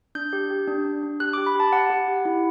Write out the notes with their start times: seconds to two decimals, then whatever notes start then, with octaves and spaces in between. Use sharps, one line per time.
0.15 D4 G6
0.33 G4
0.50 G4
0.68 D4
0.85 D4
1.03 D4
1.20 G4 F#6
1.33 D6
1.38 G4
1.46 B5
1.55 G4 A5
1.73 G4 F#5
1.90 G4
2.08 G4
2.25 E4